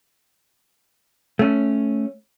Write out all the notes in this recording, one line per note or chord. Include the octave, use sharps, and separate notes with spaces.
A3 C#4